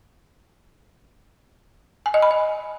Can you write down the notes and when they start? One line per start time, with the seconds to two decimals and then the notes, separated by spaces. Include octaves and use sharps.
2.06 G#5
2.14 D#5
2.22 B5
2.31 D#5